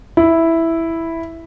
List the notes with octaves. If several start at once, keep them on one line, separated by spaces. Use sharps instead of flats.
E4